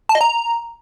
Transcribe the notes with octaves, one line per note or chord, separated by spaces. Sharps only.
A5
D#5
A#5